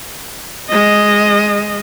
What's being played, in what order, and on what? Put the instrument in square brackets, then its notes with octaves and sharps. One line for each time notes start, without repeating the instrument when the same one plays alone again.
[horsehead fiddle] G#3 D#5